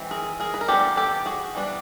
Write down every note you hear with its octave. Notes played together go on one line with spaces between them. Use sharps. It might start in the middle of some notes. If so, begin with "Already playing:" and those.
Already playing: E3 G#3 C4
G#4 A#4
G#4 A#4
B4
A#4
E3 G3 B3 D4 G4 A4
G4 A4
F#4 G#4
E3 G3 B3 D4